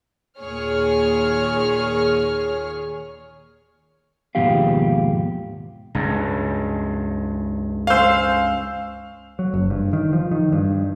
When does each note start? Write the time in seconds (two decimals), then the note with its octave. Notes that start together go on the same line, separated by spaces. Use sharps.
0.40 D#2 A#2 G#4 C#5 F6
4.35 D#2 G#2 B2 F3 G4 F5
5.95 C#2 G2
7.87 C#4 C5 F5 E6
9.39 F#3
9.54 F#1
9.70 G2
9.93 D#3
10.13 F3
10.31 D#3
10.52 G2